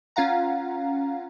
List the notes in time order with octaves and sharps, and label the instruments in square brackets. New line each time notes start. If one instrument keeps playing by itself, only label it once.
[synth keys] C#4 F4 F5 F#5 A#5